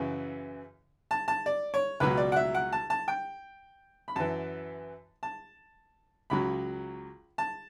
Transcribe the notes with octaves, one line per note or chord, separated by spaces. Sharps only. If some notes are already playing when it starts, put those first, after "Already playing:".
Already playing: F#2 C#3 E3
A5
A5
D5
C#5
C#2 B2 F#3 B4
D5
F#5
E5
F#5
A5
A5
G5
B5
F#2 E3 A5
A5
C#2 C#3 F#3 B5
A5